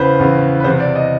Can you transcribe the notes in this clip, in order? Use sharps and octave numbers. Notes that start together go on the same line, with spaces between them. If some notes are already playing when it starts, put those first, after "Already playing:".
Already playing: E2 C#3 E3 B4 C5
E2 C#3 E3
B4
E2 C3 E3 C5
D5
D#5